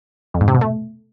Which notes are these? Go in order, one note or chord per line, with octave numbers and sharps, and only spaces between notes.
F2
G#2
C3
B2
A3